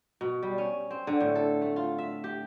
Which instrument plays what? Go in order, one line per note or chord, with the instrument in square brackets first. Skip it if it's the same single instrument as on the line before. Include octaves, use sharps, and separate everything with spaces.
[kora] B2
G3
C#4
C4
D3
A2
A4
A3
F4
E5
G4